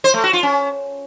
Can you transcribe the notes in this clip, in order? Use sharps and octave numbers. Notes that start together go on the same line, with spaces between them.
C5
A3
F#4
F4
C#4